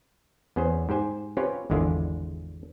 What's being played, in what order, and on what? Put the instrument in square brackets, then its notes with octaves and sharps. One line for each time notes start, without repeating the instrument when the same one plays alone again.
[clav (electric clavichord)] E2 B3 C#4 G#4 C5
G#2 G4 C5 G#5
C4 C#4 F4 G4 B4 C#5
G#1 E2 D3 G#3 E4 F4